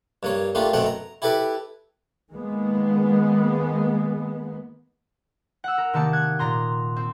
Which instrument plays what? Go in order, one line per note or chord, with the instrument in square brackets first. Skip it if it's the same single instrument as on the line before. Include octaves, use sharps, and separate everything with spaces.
[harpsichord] G2 A#3 C#5
A3 A#3 D4 F4 G4
F#2 B2 A3 C4 F#5 G5
A#5
E4 G4 A4 B4 D6
[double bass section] D#3 G#3 A#3 B3
[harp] F#5 E6
A#4
C3 D#3 A#3 A5 C#7
F#6 G#6
A#2 A#5 C6
C4